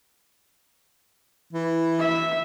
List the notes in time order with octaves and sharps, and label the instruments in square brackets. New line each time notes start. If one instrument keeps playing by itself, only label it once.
[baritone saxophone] E3
[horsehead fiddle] E5